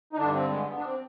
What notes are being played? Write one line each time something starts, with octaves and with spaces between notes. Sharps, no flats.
D#4
G2 D3 D4
C4
G#3
B3
D4
C4